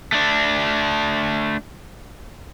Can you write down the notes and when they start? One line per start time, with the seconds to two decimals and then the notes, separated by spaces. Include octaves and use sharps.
0.12 A3 D4